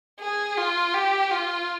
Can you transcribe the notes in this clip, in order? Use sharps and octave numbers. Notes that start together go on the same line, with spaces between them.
G#4
F4
G4
F4